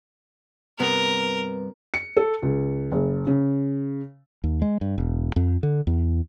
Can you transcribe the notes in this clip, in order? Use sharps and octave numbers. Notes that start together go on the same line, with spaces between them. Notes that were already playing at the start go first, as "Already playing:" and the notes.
G2 C3 B3 A#4
C#7
A4
C#2
F#1
C#3
D#2
G#3
G2
E1
F2
D3
E2